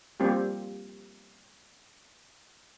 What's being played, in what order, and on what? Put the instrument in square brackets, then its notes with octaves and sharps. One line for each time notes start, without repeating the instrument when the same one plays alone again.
[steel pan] G3 A#3 C4 F4 G4